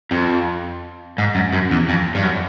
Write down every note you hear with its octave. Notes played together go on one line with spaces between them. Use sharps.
F2
G#2
F#2
F#2
E2
F2
G2
F#2